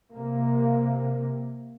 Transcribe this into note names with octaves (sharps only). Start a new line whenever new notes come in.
C3 A#3